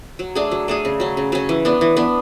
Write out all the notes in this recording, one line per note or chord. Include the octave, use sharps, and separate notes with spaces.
F#3
A3 D4 G#4
F#3
A3 D4 G#4
C#3
F#3 C#4
C#3
F#3 C#4
E3
B3 D4
E3
B3 D4